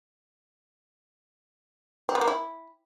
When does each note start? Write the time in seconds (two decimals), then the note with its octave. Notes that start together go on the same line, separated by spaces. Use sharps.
2.09 C4
2.15 B3
2.21 A#3
2.28 E4